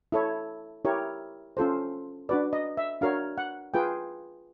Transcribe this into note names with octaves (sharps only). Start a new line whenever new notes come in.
E4 A4 C#5
E4 G4 A#4 C#5
C#4 F4 A4 C5
D4 F#4 B4 D5
D#5
E5
D4 F#4 A#4 C#5 F5
F#5
F4 G#4 B4 G5